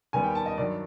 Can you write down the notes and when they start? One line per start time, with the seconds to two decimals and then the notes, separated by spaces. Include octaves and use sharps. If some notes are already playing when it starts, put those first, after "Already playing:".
0.13 D#2 D#3 G3 B3 G#5
0.24 G5
0.35 A5
0.46 D#5
0.58 G2 D#3 F#3 D5